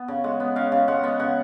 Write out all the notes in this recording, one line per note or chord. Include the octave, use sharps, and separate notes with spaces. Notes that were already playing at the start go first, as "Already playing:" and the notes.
Already playing: B3
C#3
G#3 F#5
B3
C#3 F5
C#3
G#3 F#5
B3
C#3 F#5